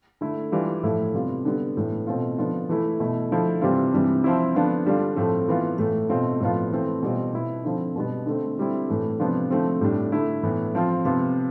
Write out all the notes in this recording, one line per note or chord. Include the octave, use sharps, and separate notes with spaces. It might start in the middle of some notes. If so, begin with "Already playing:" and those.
D3 A3 E4
E3 G3 D4 F4
A2 F3 A3 E4
C3 G3 B3 F4
D3 G3 B3
A2 E3 B3
B2 A3 C4 F4
D3 F3 B3 D4 F4
E3 A3 E4
B2 A3 E4
D3 F3 A3 E4
C3 E3 G3 C4 F4
C3 E3 G3 D4
F3 C4 E4
D3 F3 B3 D4 F4
D3 G3 D4 F4
A2 F3 A3 C4
E3 B3 F4
A2 E3 A3
B2 A3 C4 F4
A2 F3 B3 F4
E3 A3 C4
B2 G3 C4 F4
B2 B3 E4
D3 F3 C4
B2 G3 B3
D3 A3 C4
D3 G3 C4 E4
A2 E3 A3
C3 F3 B3 D4 F4
D3 F3 A3 C4
A2 G3 D4
D3 A3 E4
A2 E3 B3
F3 C4 F4
C3 F3 B3 F4